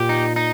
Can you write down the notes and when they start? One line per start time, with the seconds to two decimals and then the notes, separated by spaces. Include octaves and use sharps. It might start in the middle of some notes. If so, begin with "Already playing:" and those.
Already playing: A#2 G4
0.09 D#4
0.36 D#4